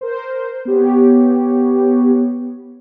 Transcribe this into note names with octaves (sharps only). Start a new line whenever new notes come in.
A#4 C5
B3 G4 C#5